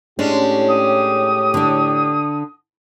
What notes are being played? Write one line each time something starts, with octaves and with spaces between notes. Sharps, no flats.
A2 G#3 C#4 D4 G4
D#6
D3 D4